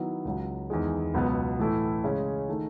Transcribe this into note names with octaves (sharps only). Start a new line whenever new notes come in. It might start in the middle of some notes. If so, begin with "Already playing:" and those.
Already playing: D#3 F#3 B3 E4
C#2 C#3 F#3
E2 D#3 G#3
C#2 B2 F#3 B3
A2 E3 A3 E4
C#3 G#3 C#4
D#3 A3